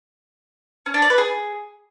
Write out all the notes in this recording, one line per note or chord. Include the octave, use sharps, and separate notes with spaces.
C#4
D4
D5
B4
G#4